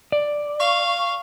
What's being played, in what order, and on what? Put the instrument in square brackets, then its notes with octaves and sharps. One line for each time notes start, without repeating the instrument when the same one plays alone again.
[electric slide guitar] D5
[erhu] F5 [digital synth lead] C#6